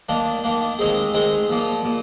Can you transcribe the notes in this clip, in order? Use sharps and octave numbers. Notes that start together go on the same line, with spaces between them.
D#3 A#3 D4
D#3 A#3 D4
D#3 G#3 C4 D#4 G#4
D#3 G#3 C4 D#4 G#4
A#2 F3 A#3
A#2